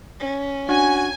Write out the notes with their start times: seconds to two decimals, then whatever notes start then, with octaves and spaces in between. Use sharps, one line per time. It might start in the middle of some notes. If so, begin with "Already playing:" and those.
0.20 C#4
0.69 D4 F#4 G#5